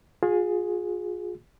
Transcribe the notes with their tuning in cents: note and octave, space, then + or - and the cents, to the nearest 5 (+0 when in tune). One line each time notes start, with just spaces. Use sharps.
F4 +40 G#4 +0